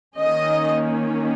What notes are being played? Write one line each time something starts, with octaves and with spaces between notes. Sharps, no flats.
D#3 A#3 C#4 D#5